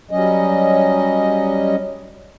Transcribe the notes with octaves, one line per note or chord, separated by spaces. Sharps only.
F#3 G3 C#4 D#5